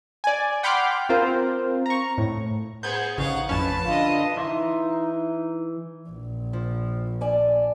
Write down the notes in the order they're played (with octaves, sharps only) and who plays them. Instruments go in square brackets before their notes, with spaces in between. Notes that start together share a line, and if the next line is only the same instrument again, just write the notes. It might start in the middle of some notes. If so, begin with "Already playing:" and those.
[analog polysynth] D5 G#5
F#5 G5 B5 C6 D6 F6
C4 F4 A#4 C5
A#5 C#6
A2
[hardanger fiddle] B3 G#4 [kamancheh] C5 [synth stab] G6 G#6
[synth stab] A1 C#3 [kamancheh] D#4 C#6 [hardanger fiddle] F5 F#5
[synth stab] A1 F2 C#4 [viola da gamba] F3 [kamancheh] B4 [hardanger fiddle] A5
[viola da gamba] D3 D#5 [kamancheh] F4 B4
[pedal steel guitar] E3 E5 C6 [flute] D#4
[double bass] A#1
[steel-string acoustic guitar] F3
D5 G#5 A5